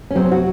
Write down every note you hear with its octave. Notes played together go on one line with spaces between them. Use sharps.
C#4
C3 F#3 C4
F#4